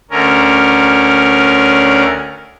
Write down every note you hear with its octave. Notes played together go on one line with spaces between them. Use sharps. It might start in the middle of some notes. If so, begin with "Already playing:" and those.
D2 D3 C#4 A#4